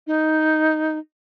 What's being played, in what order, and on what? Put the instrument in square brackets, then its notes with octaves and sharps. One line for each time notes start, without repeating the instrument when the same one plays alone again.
[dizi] D#4